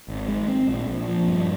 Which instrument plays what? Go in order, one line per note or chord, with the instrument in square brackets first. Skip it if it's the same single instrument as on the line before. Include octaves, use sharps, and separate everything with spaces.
[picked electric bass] G#1
G#3
C4
A#1
A#1
F3
G2